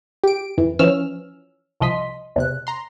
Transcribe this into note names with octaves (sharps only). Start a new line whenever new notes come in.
G4 D7
F2 E3
E3 F3 C#4 E6 F6
C2 C3 F3 D#5 C6 B6
E2 C3 F#6
A#5 C6